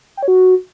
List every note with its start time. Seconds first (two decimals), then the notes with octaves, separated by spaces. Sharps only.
0.17 G5
0.23 C#5
0.28 F#4